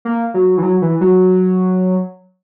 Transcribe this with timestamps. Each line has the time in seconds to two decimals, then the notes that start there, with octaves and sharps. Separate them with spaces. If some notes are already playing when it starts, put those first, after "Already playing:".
0.05 A#3
0.34 F#3
0.58 E3
0.63 F#3
0.82 E3
1.01 F#3